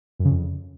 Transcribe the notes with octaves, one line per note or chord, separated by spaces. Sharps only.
F#2
C#3
F2